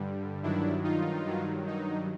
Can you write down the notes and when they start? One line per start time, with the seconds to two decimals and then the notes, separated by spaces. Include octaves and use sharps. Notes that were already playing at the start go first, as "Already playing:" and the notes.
Already playing: G2 D3 G3
0.43 G2 D#3 F#3 D4 E4
0.84 D#4 F4
1.26 G2 D#3 F#3
1.67 D#4